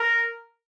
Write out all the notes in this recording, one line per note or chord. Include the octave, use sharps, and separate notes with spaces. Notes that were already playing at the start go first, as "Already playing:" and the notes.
Already playing: A#4